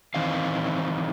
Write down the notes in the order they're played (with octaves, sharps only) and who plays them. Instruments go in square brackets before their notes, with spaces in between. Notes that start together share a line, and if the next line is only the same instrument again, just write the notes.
[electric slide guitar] D#3 E3 C4 D#4 F5